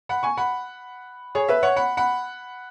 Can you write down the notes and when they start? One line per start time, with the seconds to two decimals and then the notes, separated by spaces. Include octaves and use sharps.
0.09 F#5 B5
0.23 G#5 C#6
0.37 F#5 B5
1.35 G#4 C#5
1.49 B4 E5
1.63 C#5 F#5
1.76 F#5 B5
1.97 F#5 B5